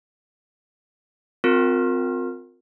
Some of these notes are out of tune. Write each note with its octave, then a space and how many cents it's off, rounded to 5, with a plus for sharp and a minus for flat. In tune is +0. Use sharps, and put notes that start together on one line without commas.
C4 -15 F4 +35 A#4 -15